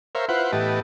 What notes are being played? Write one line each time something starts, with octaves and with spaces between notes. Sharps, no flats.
A#4 C5 C#5 E5 F5
E4 F4 B4 C5 F#5
A2 E3 B3 G4 D#5 A5